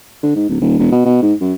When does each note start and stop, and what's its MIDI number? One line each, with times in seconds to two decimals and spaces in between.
0.23 0.33 50
0.35 0.48 44
0.49 0.60 26
0.61 0.75 27
0.78 0.90 28
0.92 1.04 47
1.05 1.20 47
1.22 1.33 44
1.41 1.53 42